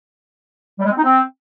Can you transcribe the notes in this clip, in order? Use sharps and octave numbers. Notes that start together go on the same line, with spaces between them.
G3
G#3
C4
D#4
C4